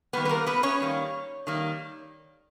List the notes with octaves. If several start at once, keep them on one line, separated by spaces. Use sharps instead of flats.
D#3 G3 A#3 B3 B4
B4
A#3 A#4
B3 B4
C#4 C#5
D#3 G3 A#3
D#3 G3 A#3